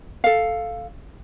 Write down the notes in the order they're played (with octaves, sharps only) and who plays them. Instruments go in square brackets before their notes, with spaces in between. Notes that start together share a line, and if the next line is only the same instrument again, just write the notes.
[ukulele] A4 F5